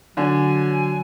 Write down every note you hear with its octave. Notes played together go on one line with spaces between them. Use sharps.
D3 F#3 D4 G#5